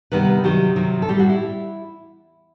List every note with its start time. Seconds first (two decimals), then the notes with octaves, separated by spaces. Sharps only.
0.12 C3 D#3 G3 B3 B4
0.44 C3 D#3 F#3 G4
0.76 C3 D#3 F#3
1.02 A4
1.08 A2 G3 C4 G4
1.19 F#4
1.29 E4